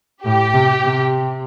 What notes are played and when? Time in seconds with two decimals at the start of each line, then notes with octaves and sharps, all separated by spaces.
0.25 A2 G4
0.53 C3
0.82 C3